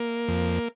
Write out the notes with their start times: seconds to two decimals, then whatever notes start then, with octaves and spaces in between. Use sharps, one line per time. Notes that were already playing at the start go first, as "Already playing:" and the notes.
Already playing: A#3
0.28 F2